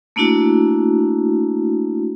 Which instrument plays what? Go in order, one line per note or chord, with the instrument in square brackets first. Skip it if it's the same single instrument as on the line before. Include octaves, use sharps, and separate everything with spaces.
[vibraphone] A3 A#3 D4 E4 F#4